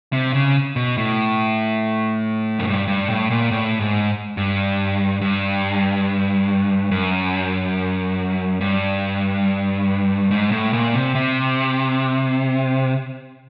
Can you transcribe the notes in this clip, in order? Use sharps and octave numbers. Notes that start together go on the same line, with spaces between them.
C3
C#3
B2
A2
F#2
G2
G2
A2
A#2
A2
G#2
G2
G2
F#2
G2
G#2
A2
A#2
C3
C3